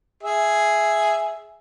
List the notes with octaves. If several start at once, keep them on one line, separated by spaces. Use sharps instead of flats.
G#4 E5